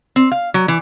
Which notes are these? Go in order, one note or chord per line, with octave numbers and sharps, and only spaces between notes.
C4
F5
F#3
E3